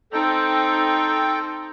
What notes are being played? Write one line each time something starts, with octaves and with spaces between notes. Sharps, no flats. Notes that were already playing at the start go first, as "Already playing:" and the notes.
C4 D#4 A4 G5